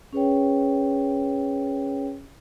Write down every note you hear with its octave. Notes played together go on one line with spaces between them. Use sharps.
C#4 G#4 B4 C#5 G5